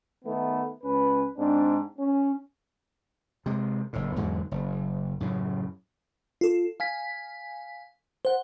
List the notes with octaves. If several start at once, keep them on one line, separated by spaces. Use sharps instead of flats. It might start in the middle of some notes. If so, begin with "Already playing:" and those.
D#3 A3 B3
C#2 C#4 B4
G#2 C4 D4
C#4
C3 G#3
F#1 A2
E2 G#2 D3 F#3
F#1
F#2 A2 C#3
F4 A4
F5 G#5 B6
C5 F#5